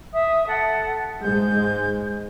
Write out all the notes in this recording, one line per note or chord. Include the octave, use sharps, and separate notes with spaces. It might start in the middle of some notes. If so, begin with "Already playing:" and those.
E5 D#6
A4 F#5
G#2 G#3 G6